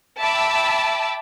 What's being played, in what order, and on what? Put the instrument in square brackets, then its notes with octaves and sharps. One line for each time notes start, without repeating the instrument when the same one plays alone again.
[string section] E5 G5 A5 B5 D6 E6